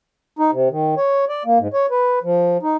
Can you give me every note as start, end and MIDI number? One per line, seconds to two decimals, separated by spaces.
0.39 0.51 63
0.52 0.69 48
0.70 0.95 51
0.97 1.25 73
1.29 1.43 74
1.45 1.58 58
1.59 1.68 44
1.73 1.86 73
1.91 2.19 71
2.23 2.57 53
2.62 2.77 63